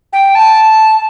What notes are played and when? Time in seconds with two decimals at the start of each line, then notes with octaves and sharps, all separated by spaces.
0.13 G5
0.35 A5